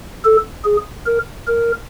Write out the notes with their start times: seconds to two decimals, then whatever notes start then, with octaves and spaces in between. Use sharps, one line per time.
0.25 A4
0.65 G#4
1.06 A#4
1.47 A#4